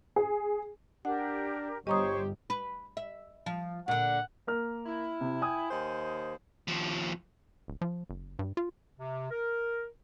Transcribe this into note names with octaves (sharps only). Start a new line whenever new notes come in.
G#4
D4 G4 A#4 F#5
G1 G4 C5 C#5 D#5 A#5 C#6 D#6
B4
E5
F3
A#2 D3 F#5
A#3 A#4 F6
E4
C3
G5 G#5 D#6
D#2 C5 D#5
D#2 F3
D1
F3
F#1
G2
F4
C3
A#4